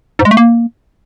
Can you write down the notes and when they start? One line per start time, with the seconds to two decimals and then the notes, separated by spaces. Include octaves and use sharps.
0.19 G#2
0.25 G#3
0.31 A3
0.37 A#3